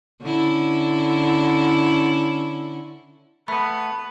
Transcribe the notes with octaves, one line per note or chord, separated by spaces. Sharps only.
D3 C#4 E4
A3 B3 B4 B5